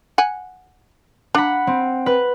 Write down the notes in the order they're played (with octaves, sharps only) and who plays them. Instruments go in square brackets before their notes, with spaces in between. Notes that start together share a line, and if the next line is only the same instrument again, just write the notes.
[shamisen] F#5 G#5
[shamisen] D4 [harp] F#5 B5
[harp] C4
B4